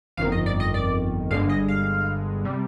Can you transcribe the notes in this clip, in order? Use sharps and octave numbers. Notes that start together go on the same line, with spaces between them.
G1 F2 D#3 F5
D#5
D5
D#5
D5
G1 G2 D3 G#3 F5
D#5
F5
C3 G3